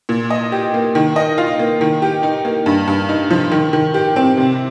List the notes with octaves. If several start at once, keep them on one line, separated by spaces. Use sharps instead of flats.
A#2
D#5
G4
A#3
D#3
D#5
F4
A#3
D#3
G4
D#4
A#3
G2
G2
D#4
F3
D#3
D#3
G4
C4
C3